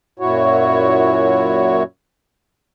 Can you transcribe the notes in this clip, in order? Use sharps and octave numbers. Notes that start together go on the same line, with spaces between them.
F#2 A#2 E4 F#4 C#5